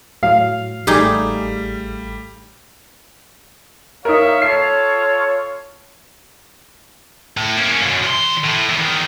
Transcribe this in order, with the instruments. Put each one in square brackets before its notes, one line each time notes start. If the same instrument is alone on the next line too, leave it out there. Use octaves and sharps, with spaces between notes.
[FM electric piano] A2 F#3 [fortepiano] F5
[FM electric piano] A1 A3 [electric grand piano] G3 [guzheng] D#4 G4 G#4
[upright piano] D#4 A#4 [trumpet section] C#5 E5 F5
[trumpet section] F4 A4 C#5 [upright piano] C7
[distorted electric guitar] A2
A#3 C#4
F#2 B2
E2 C6
A2
E2 D#3